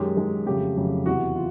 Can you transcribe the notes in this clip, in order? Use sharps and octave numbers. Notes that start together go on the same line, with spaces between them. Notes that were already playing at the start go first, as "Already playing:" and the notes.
Already playing: F#2 D#3 G#3 G4
F#2 D#3 G#3
F2 C#3 F#3 A3 G4
F2 C#3 F#3 A3
E2 C3 E3 F#4
F4